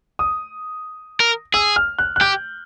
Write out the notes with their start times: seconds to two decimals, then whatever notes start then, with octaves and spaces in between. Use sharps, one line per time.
0.19 D#6
1.20 A#4
1.54 G#4 E6
1.76 F6
1.99 F#6
2.16 F#6
2.21 G4 G6